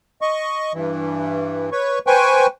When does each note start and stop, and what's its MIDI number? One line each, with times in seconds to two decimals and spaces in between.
0.21 0.73 75
0.21 0.73 85
0.74 1.70 43
0.74 1.70 52
1.72 1.99 71
1.72 1.99 73
1.72 1.99 85
2.07 2.47 71
2.07 2.47 72
2.07 2.47 79
2.07 2.47 80
2.07 2.47 85